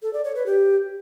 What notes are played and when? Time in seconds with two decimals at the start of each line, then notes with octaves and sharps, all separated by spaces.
0.03 A4
0.13 D5
0.24 C#5
0.35 B4
0.46 G4